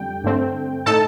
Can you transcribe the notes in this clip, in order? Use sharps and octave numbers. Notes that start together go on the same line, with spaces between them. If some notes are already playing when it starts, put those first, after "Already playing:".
Already playing: F2 D3 G3 G5
G2 D3 A3 C4
A2 A3 D#4 A4 A5